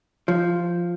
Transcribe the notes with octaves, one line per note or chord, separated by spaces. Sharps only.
F3